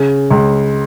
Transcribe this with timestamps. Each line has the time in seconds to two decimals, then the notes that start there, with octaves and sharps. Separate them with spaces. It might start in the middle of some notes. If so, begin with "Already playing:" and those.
Already playing: C#3
0.31 C#2